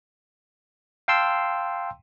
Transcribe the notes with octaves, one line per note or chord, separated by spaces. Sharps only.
F5 G5 A5 C6 E6